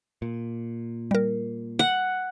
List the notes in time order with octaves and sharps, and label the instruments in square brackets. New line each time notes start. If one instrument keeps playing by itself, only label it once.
[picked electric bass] A#2
[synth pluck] G3 A#4
[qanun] F#5